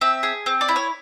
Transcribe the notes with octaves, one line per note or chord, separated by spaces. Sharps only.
C4 E5
G#4
C4
D5
E4
C#5